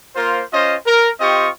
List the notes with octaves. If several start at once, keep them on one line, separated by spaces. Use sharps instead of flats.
A#3 F4 A#4 C5
C#4 F4 C5 D#5
A#4
C4 F4 G4 D#5 C#6